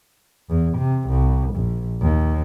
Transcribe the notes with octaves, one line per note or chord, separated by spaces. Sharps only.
E2
C3
C2
A#1
D#2